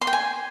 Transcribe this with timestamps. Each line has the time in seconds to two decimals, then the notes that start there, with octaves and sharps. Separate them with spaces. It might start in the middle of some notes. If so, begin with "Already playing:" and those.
0.01 C6
0.07 G5
0.13 G#5